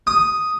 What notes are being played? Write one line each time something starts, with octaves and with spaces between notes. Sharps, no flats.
D#6